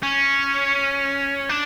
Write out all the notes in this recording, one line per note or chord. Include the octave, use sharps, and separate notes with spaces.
C#4
D4